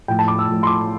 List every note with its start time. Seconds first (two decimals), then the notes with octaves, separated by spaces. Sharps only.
0.08 A2 F3 A3 G5
0.19 A5
0.28 D6
0.39 E6
0.48 A2 F3 A3
0.63 C6
0.67 D6